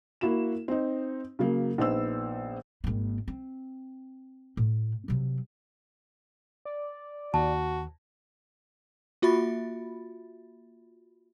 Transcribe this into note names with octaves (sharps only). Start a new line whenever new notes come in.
A#3 E4 F#4 E7
C4 D#4
C#3 F#3 A#3
A#1 B3 D#4 C5 E6
G#1 A#3
C4
A2
C3 F#3
D5
D#2 F#4 A5
A#3 F4 F#4 E5 B5 A6